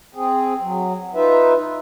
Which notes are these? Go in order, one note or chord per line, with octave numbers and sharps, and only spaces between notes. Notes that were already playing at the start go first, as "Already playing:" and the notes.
C4 G#4
F#3
D#4 F4 B4 E5